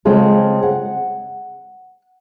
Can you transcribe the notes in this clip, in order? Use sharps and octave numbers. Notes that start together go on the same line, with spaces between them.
C#3 G#3 C4 F4 G#4 A4
F#5